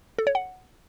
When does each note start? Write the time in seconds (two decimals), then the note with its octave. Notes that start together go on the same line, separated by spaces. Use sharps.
0.18 A4
0.27 C#5
0.35 F#5